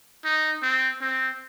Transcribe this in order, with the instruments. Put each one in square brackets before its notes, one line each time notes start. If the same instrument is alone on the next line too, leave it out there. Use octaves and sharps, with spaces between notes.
[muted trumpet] D#4
C4
C4